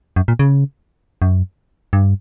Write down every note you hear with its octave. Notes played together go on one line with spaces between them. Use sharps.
F#2
A#2
C#3
F#2
G2